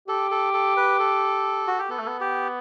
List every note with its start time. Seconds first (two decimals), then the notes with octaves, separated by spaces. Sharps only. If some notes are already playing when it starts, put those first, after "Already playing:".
0.08 G4 A4
0.31 A4
0.53 A4
0.77 B4
0.99 A4
1.67 F#4
1.79 G4
1.90 B3 A4
1.99 A3
2.07 B3
2.21 G4